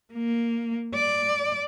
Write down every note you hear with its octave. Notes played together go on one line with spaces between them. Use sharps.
A#3
D5